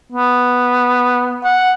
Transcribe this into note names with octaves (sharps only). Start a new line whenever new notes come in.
B3
F#5